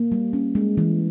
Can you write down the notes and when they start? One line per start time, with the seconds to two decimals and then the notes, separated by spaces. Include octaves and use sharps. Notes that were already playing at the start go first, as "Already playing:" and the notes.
Already playing: A#3
0.12 G3
0.33 C#4
0.55 G#3
0.77 E3